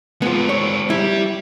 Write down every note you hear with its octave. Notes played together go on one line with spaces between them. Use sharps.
G#3 B3 C4 F4
C#5
G3 E4